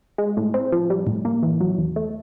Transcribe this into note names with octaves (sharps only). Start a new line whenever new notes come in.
G#3
A2
C4
F3
G3
A2
A#3
E3
F#3
E2
A3